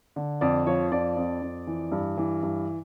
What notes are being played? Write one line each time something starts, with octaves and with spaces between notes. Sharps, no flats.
D3
F2 D5
F3 C#5
F2 D5
F2
F2
E3
G2
E3
G2